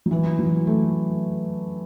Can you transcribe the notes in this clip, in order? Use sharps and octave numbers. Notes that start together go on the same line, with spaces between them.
F#3
E3
F#3
A3